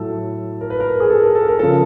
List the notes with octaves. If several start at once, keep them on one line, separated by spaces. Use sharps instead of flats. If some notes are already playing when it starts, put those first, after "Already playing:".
Already playing: A2 F#3 A4
A#4
B4
A#4
G#4
A4
A#4
A4
A#4
C#3 F3 A4